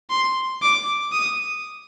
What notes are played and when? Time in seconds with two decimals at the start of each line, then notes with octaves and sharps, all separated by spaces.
0.10 C6
0.62 D6
1.12 D#6